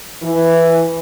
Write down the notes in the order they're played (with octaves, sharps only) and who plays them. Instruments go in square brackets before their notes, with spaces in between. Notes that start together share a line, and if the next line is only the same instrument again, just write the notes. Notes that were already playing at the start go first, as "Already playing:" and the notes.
[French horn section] E3